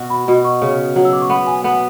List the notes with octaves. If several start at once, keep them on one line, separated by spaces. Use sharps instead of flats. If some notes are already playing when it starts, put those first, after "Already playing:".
Already playing: B2 F#4
B5
B2 B5
C#6
C#3
F#3
E6
D6
C#6
B3 B5
G#5
B3 F#5